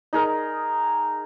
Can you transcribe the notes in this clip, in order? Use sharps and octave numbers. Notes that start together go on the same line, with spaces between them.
D#4 G#4 A#4